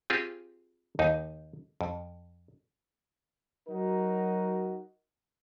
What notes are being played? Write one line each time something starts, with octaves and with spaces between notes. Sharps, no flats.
C4 F4 G4 G#4
D#2 D#4
F2
F#3 D#4 F#4 A#4